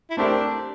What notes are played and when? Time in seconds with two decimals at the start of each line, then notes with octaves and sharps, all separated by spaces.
0.10 E4
0.17 A3 C4 D4 G4 A#4